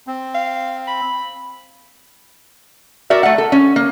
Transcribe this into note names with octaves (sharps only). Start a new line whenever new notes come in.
C4
F5
B5
F#4 A#4 D5 E5
A3 F#5
A4
C#4
A#3